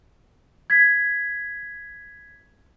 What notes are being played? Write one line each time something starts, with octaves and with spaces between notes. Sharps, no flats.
G#6 B6